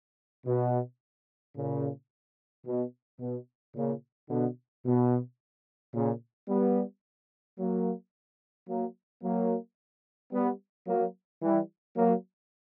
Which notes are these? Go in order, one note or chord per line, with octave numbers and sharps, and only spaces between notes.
B2
A#2 C#3
B2
B2
A#2 C#3
B2 D3
B2
A#2 C#3
G3 B3
F#3 A#3
F#3 A#3
F#3 A#3
G3 B3
F#3 A#3
E3 G3
F#3 A#3